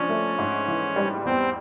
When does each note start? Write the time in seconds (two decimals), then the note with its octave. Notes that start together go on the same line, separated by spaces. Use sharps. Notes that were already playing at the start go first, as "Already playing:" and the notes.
Already playing: F3 C#4 D4
0.09 A3
0.39 G#2
0.68 E3
0.96 G3
1.25 E2 C4